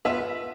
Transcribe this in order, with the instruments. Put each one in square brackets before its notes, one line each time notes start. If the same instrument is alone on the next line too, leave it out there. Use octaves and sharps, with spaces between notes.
[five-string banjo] B3 F4 B4 [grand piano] E5